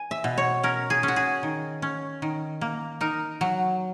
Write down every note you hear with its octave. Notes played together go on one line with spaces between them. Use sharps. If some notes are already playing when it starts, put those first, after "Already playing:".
Already playing: G#5
E5
B2
C#5
C#4 A#4
G#4
C#4
F#4
G#4
D#3
C#4
D#3
A#3
D#4 A#4
F#3